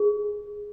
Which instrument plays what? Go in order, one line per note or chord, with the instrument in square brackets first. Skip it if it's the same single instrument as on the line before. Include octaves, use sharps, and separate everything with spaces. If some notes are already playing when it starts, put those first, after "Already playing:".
Already playing: [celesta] G#4